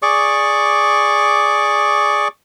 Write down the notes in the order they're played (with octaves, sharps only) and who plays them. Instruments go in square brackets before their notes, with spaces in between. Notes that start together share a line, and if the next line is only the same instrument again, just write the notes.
[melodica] G#4 D5 C#6 D6